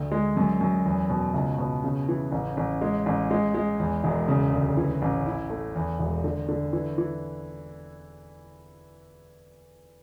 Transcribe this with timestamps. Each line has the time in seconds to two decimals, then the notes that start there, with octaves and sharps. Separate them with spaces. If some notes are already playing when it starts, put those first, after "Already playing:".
Already playing: D2
0.11 G#3
0.37 F#2
0.61 F#2
0.85 E2
1.10 B2
1.34 C#2
1.58 B2
1.84 C#3
2.08 E3
2.32 A1
2.57 A1
2.82 G#3
3.06 A1
3.31 G#3
3.54 G#3
3.79 E2
4.04 E1
4.28 C#3
4.53 D2
4.77 E3
5.02 A1
5.26 E4
5.50 A3
5.76 E2
5.99 E1
6.24 D3
6.48 D3
6.73 E3
6.98 E3